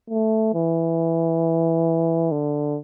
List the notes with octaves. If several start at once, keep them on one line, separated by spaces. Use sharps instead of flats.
A3
E3
D3